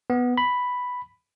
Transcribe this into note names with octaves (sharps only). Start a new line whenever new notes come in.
B3
B5